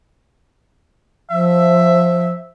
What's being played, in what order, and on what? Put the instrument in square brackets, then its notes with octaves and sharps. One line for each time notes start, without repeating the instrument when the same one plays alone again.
[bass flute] F3 [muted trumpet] E5